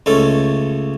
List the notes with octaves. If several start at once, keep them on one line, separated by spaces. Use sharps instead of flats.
C#2 A3 C#4 A4